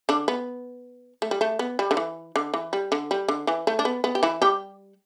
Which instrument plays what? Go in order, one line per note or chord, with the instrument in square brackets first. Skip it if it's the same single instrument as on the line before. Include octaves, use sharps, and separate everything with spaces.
[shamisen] D3 D4
B3
A3
G3
A3
B3
G3
D3
E3
D3
E3
G3
D3
G3
D3
E3
A3
D4
B3
B3
G4
E3 E4
G3 G4